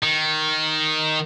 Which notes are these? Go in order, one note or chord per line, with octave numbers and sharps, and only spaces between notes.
D#3